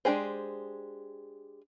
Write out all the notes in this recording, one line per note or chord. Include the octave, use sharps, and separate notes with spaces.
G#3 D4 G4 G#4 C5